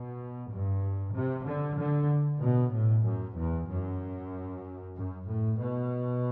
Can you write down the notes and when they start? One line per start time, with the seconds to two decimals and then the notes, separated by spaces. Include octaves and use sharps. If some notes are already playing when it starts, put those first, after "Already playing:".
Already playing: B2
0.49 G2
1.13 C3
1.45 D3
1.77 D3
2.40 B2
2.72 A2
3.04 F#2
3.36 E2
3.68 F#2
4.95 F#2
5.28 A2
5.60 B2